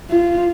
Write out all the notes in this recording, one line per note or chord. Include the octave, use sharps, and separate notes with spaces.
F4